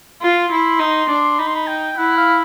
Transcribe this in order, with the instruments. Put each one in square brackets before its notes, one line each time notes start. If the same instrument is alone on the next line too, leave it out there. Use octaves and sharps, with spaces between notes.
[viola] F4 [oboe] C6
[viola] E4
D#4
D4
[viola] D#4 [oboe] B5
[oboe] C6
B5
G5
[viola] E4 [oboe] F#5
[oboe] F5